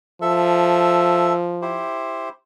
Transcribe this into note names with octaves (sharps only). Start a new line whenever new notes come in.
F3 A4 E5
E4 G4 C5